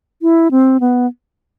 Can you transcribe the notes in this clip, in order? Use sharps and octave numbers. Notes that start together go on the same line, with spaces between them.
E4
C4
B3